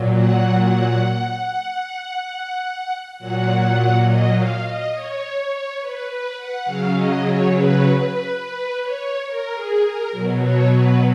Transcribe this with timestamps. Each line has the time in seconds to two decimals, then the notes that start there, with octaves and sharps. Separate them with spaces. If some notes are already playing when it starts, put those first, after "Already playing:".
Already playing: A#2 F#3
0.15 F#5
0.58 F#5
3.18 A#2 F#3 F#5
4.06 D#5
4.34 F5
4.63 D#5
4.92 C#5
5.35 C#5
5.79 B4
6.08 B4
6.37 F#5
6.65 C#3 F#3 F5
6.94 D#5
7.23 C#5
7.52 B4
7.96 B4
8.39 B4
8.82 C#5
9.26 A#4
9.54 G#4
9.84 A#4
10.12 B2 F#3
10.41 C#5
10.70 B4